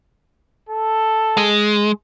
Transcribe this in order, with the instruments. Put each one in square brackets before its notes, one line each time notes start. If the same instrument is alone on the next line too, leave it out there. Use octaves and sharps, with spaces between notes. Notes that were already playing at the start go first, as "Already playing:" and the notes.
[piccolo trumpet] A4
[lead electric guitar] G#3